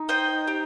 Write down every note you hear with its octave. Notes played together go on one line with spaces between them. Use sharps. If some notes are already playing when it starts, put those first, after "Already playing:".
Already playing: D#4
C5 D#5 G5
G4